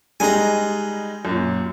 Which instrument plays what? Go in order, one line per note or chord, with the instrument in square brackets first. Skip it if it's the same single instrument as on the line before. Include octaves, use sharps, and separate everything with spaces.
[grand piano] G3 G#3 D#4 [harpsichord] G#5 A#5
[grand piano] F#2 A#2